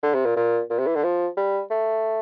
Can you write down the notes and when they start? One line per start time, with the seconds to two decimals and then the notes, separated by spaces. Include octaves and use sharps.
0.03 D3
0.14 C3
0.26 A#2
0.36 A#2
0.70 A#2
0.79 C3
0.87 E3
0.95 D3
1.03 F3
1.37 G3
1.71 A3